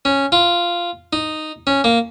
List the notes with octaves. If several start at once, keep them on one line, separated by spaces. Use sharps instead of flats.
C#4
F4
D#4
C#4
A#3